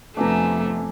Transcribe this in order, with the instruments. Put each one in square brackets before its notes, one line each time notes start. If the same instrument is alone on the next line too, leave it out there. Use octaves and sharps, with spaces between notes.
[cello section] F2 [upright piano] C3 B3 [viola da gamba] A3 [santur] D4 G#5 A#5